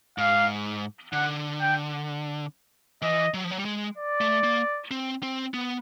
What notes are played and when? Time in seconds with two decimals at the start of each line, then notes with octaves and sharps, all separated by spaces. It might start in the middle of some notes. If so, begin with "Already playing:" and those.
0.18 G#2 F5
1.13 D3 F#5
1.61 G5
3.02 E3 D#5
3.34 F#3
3.44 F3
3.51 F#3
3.59 G3
3.65 G#3
3.97 D5
4.21 A3
4.44 A#3
4.91 C4
5.23 C4
5.54 B3